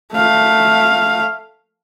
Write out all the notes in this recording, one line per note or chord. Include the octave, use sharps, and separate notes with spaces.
A3 F5